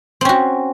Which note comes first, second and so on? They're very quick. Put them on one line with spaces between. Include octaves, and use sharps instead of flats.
C4 C#4 F#4